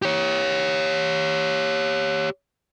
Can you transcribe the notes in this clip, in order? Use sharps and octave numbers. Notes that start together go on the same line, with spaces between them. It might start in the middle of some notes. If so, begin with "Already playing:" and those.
G4 C#5